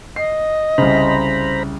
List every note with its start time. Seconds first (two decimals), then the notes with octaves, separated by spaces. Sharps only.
0.16 D#5 C7
0.78 C2 C#3 C5 A#5 B5